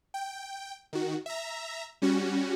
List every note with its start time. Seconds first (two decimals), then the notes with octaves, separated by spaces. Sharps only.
0.14 G5
0.93 D#3 F#4
1.26 E5 A#5
2.02 G3 C#4 F#4